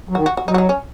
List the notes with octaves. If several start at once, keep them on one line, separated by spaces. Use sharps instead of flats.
F#3
D#3 F#4
F#4
F#4
F#3 D#4
F#4
D#4
C#4